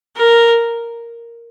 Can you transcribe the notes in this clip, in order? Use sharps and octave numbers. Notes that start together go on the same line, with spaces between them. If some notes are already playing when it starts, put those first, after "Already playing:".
A#4